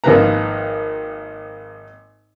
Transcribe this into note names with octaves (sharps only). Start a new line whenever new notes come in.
G#1 D#3 F3 A#3 B4 A#5